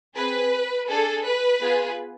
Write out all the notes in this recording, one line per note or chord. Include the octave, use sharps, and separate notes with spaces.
C4 G#4 B4
D4 G#4 A4
B4
B3 F4 G#4